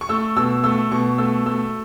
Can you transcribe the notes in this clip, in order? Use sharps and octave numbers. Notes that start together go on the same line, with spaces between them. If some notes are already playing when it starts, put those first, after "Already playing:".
C#6
A3 E6
B2 E6
A3 E6
B2 C#6
A3 E6
A3 E6